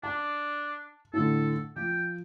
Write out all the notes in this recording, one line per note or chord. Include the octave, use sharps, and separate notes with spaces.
D4 A5
A2 D3 A4
F3 G5